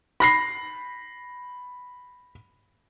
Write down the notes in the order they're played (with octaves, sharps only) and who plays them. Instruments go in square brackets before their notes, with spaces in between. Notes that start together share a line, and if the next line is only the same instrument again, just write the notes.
[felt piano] B5 A#6 C7